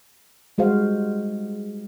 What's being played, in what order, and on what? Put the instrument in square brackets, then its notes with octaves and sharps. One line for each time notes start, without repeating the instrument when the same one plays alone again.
[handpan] G3 G#3 F#4 C5 F5